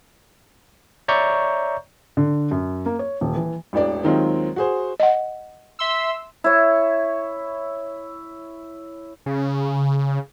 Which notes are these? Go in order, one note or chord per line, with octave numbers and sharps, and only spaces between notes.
C#5 D5 E5 A#5 C#6 G6
D3
F#2
A#3
C#5
D#1
E3
E1 A1 D4 D5
D#2 D#3 F#3 G#3 C4 F4
F#4 G#4 C5
D#5 F#5
E5 C6 E6
E4 C#5
C#3